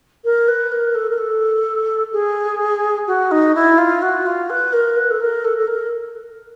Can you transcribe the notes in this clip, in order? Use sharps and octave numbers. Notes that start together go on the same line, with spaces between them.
A#4
B4
A#4
A4
A#4
A4
G#4
F#4
D#4
E4
F4
F#4
F4
B4
A#4
B4
A4
A#4
A4
A4
A#4